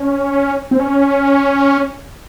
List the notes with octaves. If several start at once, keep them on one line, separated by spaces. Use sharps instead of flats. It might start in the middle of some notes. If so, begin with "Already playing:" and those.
Already playing: C#4
C4
C#4